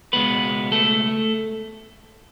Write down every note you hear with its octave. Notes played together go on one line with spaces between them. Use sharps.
C#2 B2 G#3 B3 B4
A3 A4